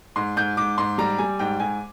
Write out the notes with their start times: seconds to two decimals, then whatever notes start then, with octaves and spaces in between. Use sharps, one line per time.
0.16 G#2 C6
0.37 G#2 G6
0.57 G#2 D6
0.78 G#2 C6
0.98 G3 A#5
1.18 G3 G#5
1.39 G#2 G5
1.60 G#2 G#5